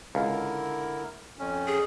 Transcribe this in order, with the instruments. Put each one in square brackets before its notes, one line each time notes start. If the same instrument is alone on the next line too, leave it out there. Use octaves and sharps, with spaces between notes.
[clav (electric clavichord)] C#2 [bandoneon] D3 E4 A#4
[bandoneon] F2 C#4
[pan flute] G#4